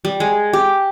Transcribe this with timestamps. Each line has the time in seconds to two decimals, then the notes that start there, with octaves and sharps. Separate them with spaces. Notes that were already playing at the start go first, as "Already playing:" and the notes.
0.05 G3
0.20 G#3
0.53 G4